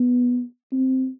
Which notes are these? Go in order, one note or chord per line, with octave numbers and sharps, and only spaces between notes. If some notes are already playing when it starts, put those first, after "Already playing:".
Already playing: B3
C4